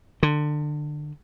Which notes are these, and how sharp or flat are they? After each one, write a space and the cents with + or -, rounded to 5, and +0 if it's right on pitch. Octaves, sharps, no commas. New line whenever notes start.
D3 +25